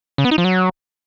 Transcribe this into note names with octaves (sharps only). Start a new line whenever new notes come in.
C#3
B3
D#4
F3
F#3